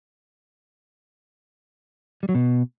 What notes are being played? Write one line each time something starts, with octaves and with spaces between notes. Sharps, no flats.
G3
F#3
B2